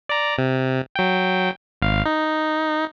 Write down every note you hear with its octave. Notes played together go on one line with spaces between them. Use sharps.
D5 A#5
C3
F#3 G5
G#1 F5
D#4